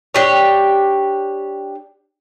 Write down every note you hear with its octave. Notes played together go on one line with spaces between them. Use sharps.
D4 G4 C#5